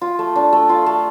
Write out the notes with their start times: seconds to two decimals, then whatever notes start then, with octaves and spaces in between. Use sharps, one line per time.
0.01 F4
0.19 A3
0.36 D4
0.53 A3
0.69 F4
0.86 A3